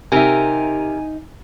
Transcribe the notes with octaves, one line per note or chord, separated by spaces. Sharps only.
C3 D#4 G4 A#4 E5 G#5